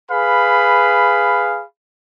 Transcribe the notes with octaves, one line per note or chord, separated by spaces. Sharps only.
G#4 B4 F5 B5